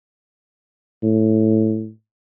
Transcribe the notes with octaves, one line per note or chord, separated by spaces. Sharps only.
A2